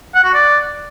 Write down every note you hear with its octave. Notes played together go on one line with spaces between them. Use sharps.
F#5
F#4
D5